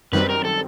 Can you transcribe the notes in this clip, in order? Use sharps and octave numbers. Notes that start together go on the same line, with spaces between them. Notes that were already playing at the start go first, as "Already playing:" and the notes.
F#2 D#3 G3 C4 B4
A#4
A4